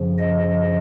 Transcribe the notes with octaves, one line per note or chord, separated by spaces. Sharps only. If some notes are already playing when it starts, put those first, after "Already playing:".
Already playing: F#2 C#3 F3
D#5